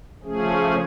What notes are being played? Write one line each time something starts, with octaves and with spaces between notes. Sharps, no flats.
C#3 F3 A3 C#4 G#4